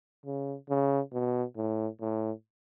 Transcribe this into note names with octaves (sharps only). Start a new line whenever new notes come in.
C#3
C#3
B2
A2
A2